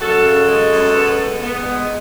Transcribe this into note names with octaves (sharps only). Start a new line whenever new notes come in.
F#2 F#4 A4
C#3
G#3
F#2
B3
G#3
B3
G#3